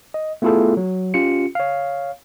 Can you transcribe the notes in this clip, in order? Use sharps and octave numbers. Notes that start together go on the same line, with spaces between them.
D#5
A3 B3 E4 F4 G#4 A4
F#3
C#4 F4 G4 C#7
C#5 F5